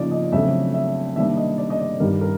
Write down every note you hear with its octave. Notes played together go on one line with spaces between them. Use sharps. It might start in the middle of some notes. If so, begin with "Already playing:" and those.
Already playing: C#3 F3 A#3 D#4 C#5 D5
D#5
F2 C#3 F#3 A3 D4 E5
E5
C3 D#3 G3 A#3 D4 E5
D#5
D5
D#5
D5
G2 D#3 G3 A#4
A#4